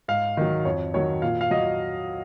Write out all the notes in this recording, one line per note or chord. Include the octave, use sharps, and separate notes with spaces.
G#2 F5
D#3 F#3
F2 C#5
D#3 F#3 C#5
A#2 F5
F5
F#3 D#5